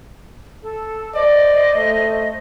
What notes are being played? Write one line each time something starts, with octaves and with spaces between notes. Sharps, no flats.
A4
C5 D5 D#5
A3